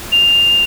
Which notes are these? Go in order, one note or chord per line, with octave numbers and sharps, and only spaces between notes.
F7